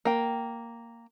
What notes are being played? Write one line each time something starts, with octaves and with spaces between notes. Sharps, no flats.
A#3 G5